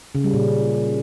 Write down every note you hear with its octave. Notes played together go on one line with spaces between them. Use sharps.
C#3
G3
A#2